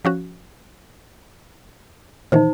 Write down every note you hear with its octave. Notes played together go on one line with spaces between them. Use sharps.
F3 C#4 F#4
A#2 D#3 E3 D#4 C5